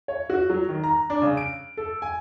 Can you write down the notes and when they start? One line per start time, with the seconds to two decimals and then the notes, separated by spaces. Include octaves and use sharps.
0.08 C#5
0.30 F#4
0.50 F#3
0.69 D#3
0.84 A#5
1.10 D4
1.22 C#3
1.37 D7
1.77 A4
2.02 G#5